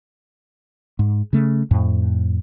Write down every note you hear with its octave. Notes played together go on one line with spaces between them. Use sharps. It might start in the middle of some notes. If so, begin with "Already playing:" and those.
G#2
C#3 A3
F2 A2